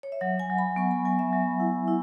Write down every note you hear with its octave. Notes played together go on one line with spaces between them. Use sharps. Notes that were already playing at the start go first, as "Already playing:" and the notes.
C#5
E5
F#3 F#5
G#5
F#3
B5
B3 C#6
B5
F#3 G#5
E5
F#3
E4
E4